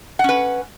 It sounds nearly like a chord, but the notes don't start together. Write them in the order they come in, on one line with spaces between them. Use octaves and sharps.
F#5 C#4 B4